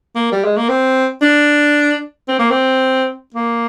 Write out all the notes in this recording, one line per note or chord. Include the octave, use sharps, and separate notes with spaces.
A#3
G3
G#3
A#3
C4
D4
C4
A#3
C4
A#3